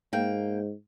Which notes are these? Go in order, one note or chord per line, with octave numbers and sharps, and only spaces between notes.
G#2 A#3 G5